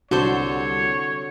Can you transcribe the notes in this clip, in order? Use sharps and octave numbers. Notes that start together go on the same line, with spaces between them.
C2 D3 F#4 A4 C5 C#5 G6